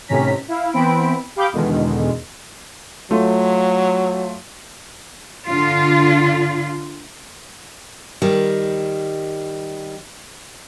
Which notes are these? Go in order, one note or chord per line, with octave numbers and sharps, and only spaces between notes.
A2 C3 D#3 C#4 A#5 B6
E4 F5
E3 B3 C4 B5 D7
G4 F5 B5 D6 D#6 G6
E2 B2 D3 D#3 G#3
F#3 A3 F4
D3 F4
D#3 G3